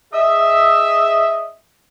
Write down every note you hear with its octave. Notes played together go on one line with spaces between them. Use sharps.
G#4 D#5 E5